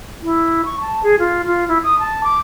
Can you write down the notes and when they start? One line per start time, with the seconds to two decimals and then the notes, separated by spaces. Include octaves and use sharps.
0.23 E4
0.65 C#6
0.81 A5
1.03 G#4
1.19 F4
1.47 F4
1.68 E4
1.83 D#6
1.99 A5
2.24 D6